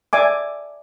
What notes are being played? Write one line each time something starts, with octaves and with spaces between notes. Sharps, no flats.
D5 E5 G#5 D6